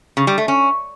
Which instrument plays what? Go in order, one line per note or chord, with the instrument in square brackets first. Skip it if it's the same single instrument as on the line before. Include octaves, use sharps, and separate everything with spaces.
[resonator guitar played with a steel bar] C#3
G3
A3
C#4